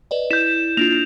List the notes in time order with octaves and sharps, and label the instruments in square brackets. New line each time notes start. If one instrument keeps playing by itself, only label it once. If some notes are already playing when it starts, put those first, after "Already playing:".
[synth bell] B4 D5 D#5
[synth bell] E4 [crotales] G6 E7
[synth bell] A#3 D4 F4 [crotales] F7